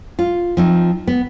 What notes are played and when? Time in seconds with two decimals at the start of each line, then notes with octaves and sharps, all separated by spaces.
0.19 F4
0.57 F3 C4 D#4
1.07 B3